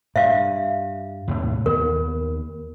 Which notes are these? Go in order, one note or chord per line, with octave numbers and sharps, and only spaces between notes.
G2 E5 F5
D#2 A2 C3
D#2 B3 A#4